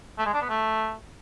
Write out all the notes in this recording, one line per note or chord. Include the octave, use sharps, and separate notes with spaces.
A3
G#3
D4
B3
A3